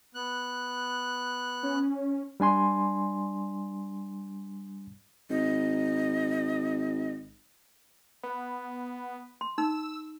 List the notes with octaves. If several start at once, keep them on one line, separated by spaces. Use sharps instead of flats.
B3 F#6
C#4
G3 D4 G#5 C6
G#1 D#5
B3
C6
D#4 E6